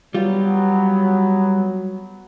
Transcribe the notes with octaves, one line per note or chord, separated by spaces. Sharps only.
F#3 G3 B3 F4